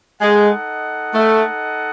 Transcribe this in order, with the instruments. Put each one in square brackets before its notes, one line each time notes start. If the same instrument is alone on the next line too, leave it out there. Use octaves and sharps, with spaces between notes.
[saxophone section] G#3 [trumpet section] D#4 A4 D#5 F#5
[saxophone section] A3